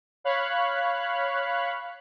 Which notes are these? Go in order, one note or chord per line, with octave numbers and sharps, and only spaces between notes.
C#5 F5 B5 F#6